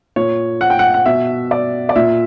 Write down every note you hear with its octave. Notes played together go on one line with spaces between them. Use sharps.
A#2 C#5
F#5
G5
F#5
F#5
B2 E5
D5
D5
A#2 E5